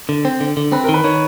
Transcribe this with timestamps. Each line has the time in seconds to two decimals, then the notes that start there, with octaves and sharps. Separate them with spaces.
0.09 D3
0.25 C4
0.40 D3
0.57 D3
0.72 C4 B4
0.84 A#4
0.89 D#3
0.94 B4
1.04 D#3 C#5